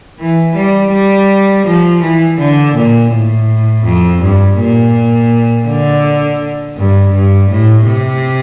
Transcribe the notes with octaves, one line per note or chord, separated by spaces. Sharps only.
E3
G3
G3
F3
E3
D3
A#2
A2
F2
G2
A#2
D3
G2
G2
A2
C3